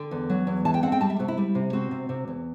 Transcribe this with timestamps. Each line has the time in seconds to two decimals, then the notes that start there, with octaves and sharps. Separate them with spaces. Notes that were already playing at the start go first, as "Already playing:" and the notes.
Already playing: D3 G5
0.11 E2
0.30 F#3
0.47 E2
0.65 E3 A5
0.74 G5
0.83 C4 F#5
0.92 G5
1.01 G3 A5
1.10 E5
1.19 C3 F#4
1.28 E4
1.37 G3
1.55 C3
1.73 C4 F#4
1.91 C3
2.09 C3
2.28 E2